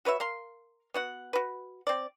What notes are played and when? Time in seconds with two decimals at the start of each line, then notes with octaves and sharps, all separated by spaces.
0.05 F#4 B4 C#5 E5
0.20 A#4 F5 C6
0.94 B3 F#4 F#5
1.33 F#4 B4
1.87 C4 D5